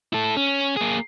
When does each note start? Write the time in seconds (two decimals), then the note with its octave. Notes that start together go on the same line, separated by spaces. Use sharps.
0.13 E4 A4
0.37 C#4
0.76 A#3 G#4